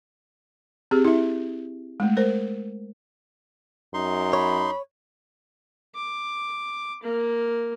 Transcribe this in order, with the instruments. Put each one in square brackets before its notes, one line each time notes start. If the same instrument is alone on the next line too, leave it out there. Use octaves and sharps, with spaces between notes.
[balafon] C4 G4 G#4
E4 E5
G#3 A3
A#4 C5
[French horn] F#2 [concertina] D#4 C6
[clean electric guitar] C#5 [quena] B5
[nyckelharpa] D6
A#3